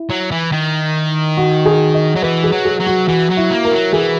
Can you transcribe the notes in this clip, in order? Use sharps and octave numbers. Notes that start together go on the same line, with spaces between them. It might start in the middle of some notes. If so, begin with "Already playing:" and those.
Already playing: E4
F#3
E3
D#3
F#4
G#4
D#5
F#3
E3 B4
G#4
F#3
G#4
F#3
F#4
E3 F#4
F#3
E4
A#3
A#4
F#3
E3 G#4